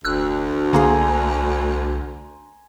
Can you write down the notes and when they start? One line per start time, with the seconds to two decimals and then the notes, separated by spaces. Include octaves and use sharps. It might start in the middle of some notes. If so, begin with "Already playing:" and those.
0.05 F1 D2 E6 F#6
0.73 C2 D3 A#3 G#4 G#5 A#5 C6